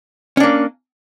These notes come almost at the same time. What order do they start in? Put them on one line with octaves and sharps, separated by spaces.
C#4 D4 A#3